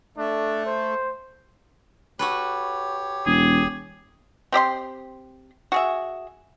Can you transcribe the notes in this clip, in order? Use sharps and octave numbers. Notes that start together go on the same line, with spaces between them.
A3 D4
C5
F#4 G4 A4 B4 C#5
E1 G#4
C4 G4 D#5 C6
F#4 G#4 E5